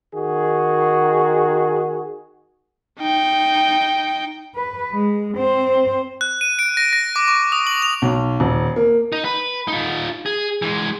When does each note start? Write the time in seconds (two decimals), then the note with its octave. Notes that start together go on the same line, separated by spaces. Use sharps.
0.14 D#3 F#4 G#4
2.99 D#4 G5
4.56 B4
4.93 G#3
5.37 C4 C5
6.21 F#6
6.41 D#7
6.59 D7
6.77 A#6
6.93 A#6
7.16 D6
7.28 C#6
7.52 D#6
7.67 F#7
7.82 F7
8.02 B1
8.40 D#1
8.76 A#3
9.12 D#4
9.25 B4
9.68 D#4 F4
10.26 G#4
10.62 E3 G#3